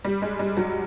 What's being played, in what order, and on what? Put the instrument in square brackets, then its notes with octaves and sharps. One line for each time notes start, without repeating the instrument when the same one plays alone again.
[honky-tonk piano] G3
G#3
G3
F#3